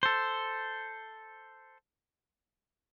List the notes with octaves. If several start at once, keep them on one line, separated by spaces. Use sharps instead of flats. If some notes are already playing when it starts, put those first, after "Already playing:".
A4 C5